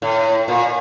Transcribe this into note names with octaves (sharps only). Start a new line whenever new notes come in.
A2
A#2